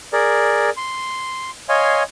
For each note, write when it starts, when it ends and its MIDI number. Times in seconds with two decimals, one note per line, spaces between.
0.13 0.70 68
0.13 0.70 70
0.13 0.70 74
0.77 1.50 84
1.69 2.03 73
1.69 2.03 75
1.69 2.03 77
1.69 2.03 80
1.69 2.03 84